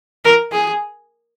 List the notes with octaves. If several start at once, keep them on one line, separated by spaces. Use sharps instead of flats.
A#4
G#4